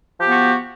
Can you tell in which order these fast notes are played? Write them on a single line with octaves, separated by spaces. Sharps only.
F3 G4 B3 F#4